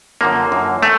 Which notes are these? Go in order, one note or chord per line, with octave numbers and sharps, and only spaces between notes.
F#2 D3 F3 A#3
F#2 D3 F3
A3